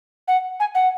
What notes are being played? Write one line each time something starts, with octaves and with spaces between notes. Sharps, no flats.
F#5
G#5
F#5